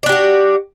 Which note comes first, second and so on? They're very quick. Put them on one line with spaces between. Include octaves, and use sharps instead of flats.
D5 D4 G4 F#4